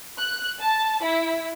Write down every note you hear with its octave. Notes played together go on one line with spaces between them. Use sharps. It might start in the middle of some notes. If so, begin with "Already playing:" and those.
F#6
A5
E4